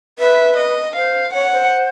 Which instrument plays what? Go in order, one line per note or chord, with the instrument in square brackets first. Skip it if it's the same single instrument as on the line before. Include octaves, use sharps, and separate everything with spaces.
[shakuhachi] B4 [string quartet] E5
[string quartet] D#5
[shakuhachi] C5 [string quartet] F5
[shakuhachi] C#5 [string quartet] F#5
[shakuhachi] C5